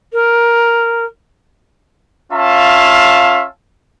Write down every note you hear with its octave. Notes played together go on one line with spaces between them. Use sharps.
A#4
C#4 F4 E5 F5 A5